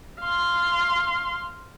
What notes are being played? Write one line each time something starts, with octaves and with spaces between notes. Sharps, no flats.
F5 C6